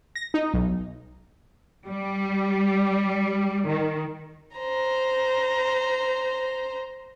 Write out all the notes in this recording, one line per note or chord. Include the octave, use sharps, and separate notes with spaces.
A#6
D#4
B1
G3
D#3
C5 A#5